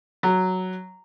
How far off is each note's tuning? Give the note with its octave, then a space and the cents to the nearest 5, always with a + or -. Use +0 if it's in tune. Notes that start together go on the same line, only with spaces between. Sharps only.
F#3 +5